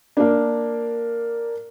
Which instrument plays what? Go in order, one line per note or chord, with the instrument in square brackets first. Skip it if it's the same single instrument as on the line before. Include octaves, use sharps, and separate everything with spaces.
[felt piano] A#3 D4